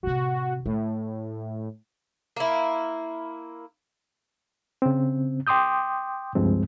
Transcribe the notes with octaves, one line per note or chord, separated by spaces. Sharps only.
A2 C3 F#4
A2 A3
A#3 E4
C#3 C4
G5 C6 D6 D#6 G6
C#2 G2 F3 G#3 C4